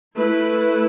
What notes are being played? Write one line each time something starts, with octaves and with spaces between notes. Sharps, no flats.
A3 E4 B4